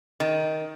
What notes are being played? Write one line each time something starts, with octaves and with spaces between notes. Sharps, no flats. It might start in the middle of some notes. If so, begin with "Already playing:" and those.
D#3